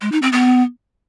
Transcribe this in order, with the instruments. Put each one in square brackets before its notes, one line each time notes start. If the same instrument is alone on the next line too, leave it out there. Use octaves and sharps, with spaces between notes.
[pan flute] G#3
D#4
C4
B3